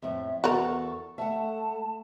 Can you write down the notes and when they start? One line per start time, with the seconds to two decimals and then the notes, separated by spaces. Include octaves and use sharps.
0.02 F2 A2 E5
0.44 E2 F#4 A4 A#4 C#6
1.18 A3 E5 F#5 A5